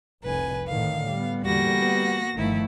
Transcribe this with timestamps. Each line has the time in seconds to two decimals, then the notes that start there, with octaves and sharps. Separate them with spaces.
0.23 F1 C2 B4 G#5
0.66 A2 D3 D#3 F5
1.10 G3 B3
1.44 E2 D3 G3 A#3 F#4 A#6
1.76 B3
2.36 G1 D#3 F3 A3 E4